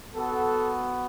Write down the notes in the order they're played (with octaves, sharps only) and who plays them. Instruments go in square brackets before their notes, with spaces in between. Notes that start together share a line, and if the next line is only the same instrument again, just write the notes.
[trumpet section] B3 F#4 A4